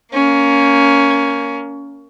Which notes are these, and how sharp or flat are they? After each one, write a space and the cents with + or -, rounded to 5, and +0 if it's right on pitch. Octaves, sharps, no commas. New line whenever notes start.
A#3 +0 C#4 +15